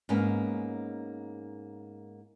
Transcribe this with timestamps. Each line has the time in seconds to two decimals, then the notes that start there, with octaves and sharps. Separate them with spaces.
0.09 G#2 A#3 B3 C#4